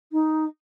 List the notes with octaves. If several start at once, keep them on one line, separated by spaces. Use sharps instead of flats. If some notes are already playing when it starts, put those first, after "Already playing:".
D#4